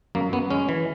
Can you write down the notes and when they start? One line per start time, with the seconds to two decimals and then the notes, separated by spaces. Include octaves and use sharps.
0.15 F#2 A#3
0.33 F#2 B3
0.50 G#3 C#4
0.69 E3